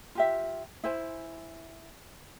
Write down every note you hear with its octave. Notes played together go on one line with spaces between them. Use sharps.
F4 G4 E5
E4 C5 G#5